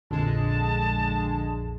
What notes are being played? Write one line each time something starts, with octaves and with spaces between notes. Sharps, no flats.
A#1 F2 D3 G#3 A5